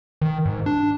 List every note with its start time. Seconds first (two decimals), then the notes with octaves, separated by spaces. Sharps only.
0.22 D#3
0.46 G#2
0.66 D4